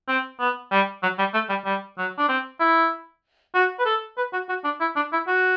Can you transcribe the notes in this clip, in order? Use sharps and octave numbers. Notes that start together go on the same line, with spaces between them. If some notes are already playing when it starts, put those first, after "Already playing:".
C4
B3
G3
F#3
G3
A3
G3
G3
F#3
D4
C4
E4
F#4
B4
A4
B4
F#4
F#4
D4
E4
D4
E4
F#4